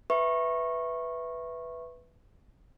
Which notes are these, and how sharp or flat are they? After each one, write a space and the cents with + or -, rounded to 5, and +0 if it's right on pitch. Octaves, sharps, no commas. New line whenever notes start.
B4 +0 E5 +0 C#6 -20